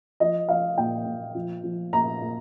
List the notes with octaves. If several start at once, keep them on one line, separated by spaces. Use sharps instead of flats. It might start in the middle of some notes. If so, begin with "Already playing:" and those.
F3 D#5
F3 F5
A#2 G5
A#2
F3
F3
A#2 A#5
A#2